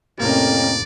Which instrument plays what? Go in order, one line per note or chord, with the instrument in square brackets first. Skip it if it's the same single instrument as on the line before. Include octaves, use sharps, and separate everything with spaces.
[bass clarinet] F2 [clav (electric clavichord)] A2 C3 A#3 [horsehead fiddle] C#4 A#4 [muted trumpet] D5